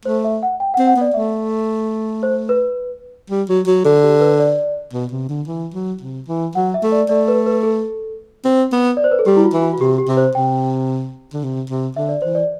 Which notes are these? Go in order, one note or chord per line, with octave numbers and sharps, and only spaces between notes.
A3 C5
E5
F#5
G5
F#5
C4
F#5
B3
D5
A3 E5
C5
B4
G3
F#3
F#3
D3 A4
G4
B4
D5
B2
C3
D3
E3
F#3
C3
E3
F#3 F#5
E5
A3
D5
A3 D5
B4
B4
A4
C4
B3
D5
C5
B4
A4
G3 G4
E4
F#4
E3
F#4
F#4
C3 G4
G4
C3
C5
C3 G5
D3
C3
C3
D3 E5
D5
E3 C5
D5